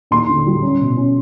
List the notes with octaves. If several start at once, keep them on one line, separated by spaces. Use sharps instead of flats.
D#2 C6
D3
G3
C#4
B2
C#4